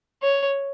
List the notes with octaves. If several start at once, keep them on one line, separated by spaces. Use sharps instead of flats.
C#5